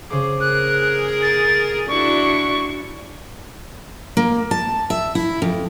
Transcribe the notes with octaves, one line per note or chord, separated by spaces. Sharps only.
C#3 G#4 C5 D6
G#4 A#4 F#6
A6
D4 E4 F#4 C#6
A#3
A5
E5
E4
F2